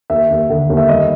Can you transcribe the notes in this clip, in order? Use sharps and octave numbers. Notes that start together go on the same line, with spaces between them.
D#2 E5
D#2
D3
D#2
E5
G3 D#5